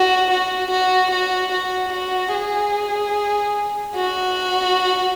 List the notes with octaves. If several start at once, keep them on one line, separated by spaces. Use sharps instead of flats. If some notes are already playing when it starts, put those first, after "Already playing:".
Already playing: F#4
F#4
F#4
F#4
F#4
F#4
G#4
F#4